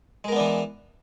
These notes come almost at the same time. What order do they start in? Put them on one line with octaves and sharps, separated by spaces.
G#3 A#4 B3 D4 E3